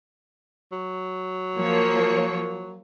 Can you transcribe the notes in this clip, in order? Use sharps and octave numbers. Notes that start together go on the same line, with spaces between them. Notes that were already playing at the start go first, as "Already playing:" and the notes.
F#3
F3 A#3 C#5